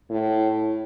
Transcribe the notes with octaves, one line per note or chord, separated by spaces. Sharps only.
A2